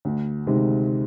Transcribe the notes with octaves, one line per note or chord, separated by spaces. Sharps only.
D2
C3 D#3 G#3